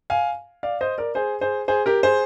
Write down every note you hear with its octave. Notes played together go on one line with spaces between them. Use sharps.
F5 G#5
D5 F5
C5 D#5
A#4 D5
G#4 C5
G#4 C5
G#4 C5
G4 A#4
G#4 C5